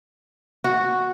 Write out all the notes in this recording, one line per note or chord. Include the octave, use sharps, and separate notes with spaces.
F#4